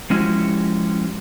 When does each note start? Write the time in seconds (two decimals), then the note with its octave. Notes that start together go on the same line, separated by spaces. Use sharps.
0.10 F3 G#3 C#4 E4 F#4 G4